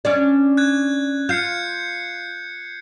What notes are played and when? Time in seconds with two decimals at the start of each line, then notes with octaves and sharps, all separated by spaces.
0.05 C#4 D4 D5
0.57 F#6 G#6
1.29 F4 G6 C7 C#7